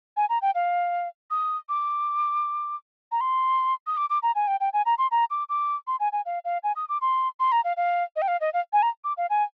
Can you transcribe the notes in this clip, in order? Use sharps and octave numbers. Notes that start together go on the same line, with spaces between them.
G#5
A#5
G5
F5
D#6
D6
A#5
C6
D#6
D6
D6
A#5
G#5
G5
G5
G#5
A#5
C6
A#5
D6
D6
C6
G#5
G#5
F5
F5
G#5
D#6
D6
C6
C6
A#5
F5
F5
D#5
G5
F5
D#5
F5
G#5
A#5
D6
F5
G#5